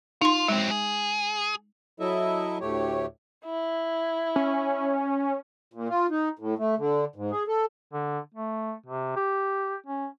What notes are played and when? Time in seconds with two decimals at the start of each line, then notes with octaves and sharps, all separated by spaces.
0.22 D#4 F4 C6
0.48 F#3 G#3 C4
0.71 G#4
2.00 F#3 E4 A4 D#5 E5
2.61 D2 A2 A3 G4 C#5
3.45 E4
4.36 C#4
5.74 A#2
5.89 F4
6.10 D#4
6.39 A2
6.58 A3
6.77 D3
7.16 G#2
7.31 G#4
7.48 A4
7.93 D3
8.35 A3
8.86 C3
9.16 G4
9.86 C#4